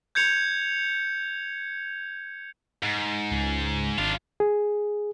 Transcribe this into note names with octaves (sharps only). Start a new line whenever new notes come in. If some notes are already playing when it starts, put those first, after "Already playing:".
G6 G#6 C#7 F7
G#2
C#2
G#1 D4 F4
G#4